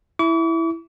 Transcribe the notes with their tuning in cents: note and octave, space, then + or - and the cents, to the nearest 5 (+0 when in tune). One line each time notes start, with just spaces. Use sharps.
E4 +0 D6 -45